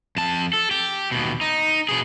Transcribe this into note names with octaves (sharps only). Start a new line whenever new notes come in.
F2 A5
A4
G4
D#2 B2
D#4
B2 G#4